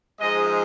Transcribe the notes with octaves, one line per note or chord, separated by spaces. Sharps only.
G#2 F3 G#3 D#5